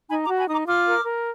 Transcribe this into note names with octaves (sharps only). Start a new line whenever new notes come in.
D#4 G#5 B5
A#5 D6
F#4
G#5 B5
D#4 A#5 D6 D#6
F4 D6 F6
A#4
A#4